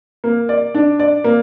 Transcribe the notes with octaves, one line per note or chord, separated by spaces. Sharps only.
A#3
D5
D4
D5
A#3